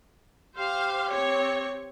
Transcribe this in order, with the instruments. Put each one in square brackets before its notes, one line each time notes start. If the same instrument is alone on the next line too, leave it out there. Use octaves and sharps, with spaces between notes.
[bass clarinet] G4 [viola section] C5 F5
[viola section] C4 C#5